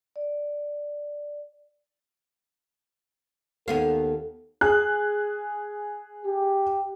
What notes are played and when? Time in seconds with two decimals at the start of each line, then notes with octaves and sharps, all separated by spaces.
0.16 D5
3.68 D#2 B3 A4 F5
4.61 G#4 F#6
6.25 G4